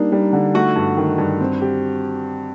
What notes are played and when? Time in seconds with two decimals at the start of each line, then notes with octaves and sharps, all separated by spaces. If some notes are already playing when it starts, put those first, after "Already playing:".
Already playing: G3 A#3 D4 D#4
0.12 G3
0.33 D3
0.54 A3 F#4
0.76 G2
0.97 D#3
1.18 G2
1.40 C4
1.62 G4